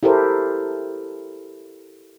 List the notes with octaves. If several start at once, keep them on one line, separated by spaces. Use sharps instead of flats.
E4 G4 A4 A#4 C5